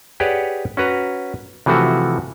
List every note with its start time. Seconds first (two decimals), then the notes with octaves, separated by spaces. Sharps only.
0.20 G4 G#4 B4 C#5 D5 F#5
0.77 C#4 F#4 B4 A#5
1.66 C3 E3 F3 A3 F#4